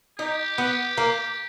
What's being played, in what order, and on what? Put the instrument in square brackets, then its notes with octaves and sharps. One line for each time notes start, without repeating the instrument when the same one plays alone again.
[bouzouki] D#4 [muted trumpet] G4
[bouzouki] B3
A#3